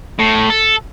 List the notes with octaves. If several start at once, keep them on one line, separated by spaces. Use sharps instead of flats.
A2
A4